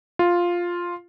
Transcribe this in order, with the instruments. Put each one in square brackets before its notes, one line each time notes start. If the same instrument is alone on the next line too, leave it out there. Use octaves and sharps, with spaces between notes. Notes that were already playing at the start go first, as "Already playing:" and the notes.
[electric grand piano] F4